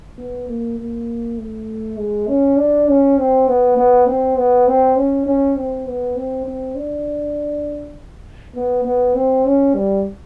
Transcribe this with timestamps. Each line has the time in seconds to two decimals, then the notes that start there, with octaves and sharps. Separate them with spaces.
0.18 B3
0.49 A#3
0.79 A#3
1.38 A3
1.98 G#3
2.28 C#4
2.57 D4
2.88 C#4
3.18 C4
3.48 B3
3.77 B3
4.07 C4
4.38 B3
4.68 C4
4.97 C#4
5.27 C#4
5.57 C4
5.87 B3
6.16 C4
6.46 C4
6.76 D4
8.55 B3
8.85 B3
9.15 C4
9.45 C#4
9.75 G3